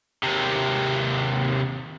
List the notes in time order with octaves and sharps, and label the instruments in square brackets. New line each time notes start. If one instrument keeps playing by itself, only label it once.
[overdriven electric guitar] D#2 C3